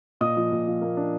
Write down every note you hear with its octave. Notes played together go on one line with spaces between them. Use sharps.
A#2 D#5 D#6
F3
A#2
F3
A#3
D4